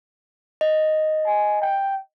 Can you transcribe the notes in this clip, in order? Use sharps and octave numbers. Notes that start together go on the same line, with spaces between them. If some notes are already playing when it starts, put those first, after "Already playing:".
D#5
G#5
G5